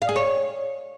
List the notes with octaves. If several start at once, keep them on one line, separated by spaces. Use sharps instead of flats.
F5
G#4
C#5